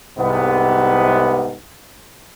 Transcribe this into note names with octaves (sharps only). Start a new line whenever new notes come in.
C2 G#2 C3 B3